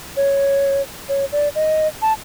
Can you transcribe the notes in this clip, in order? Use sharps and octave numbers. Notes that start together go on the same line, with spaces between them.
C#5
C#5
D5
D#5
A5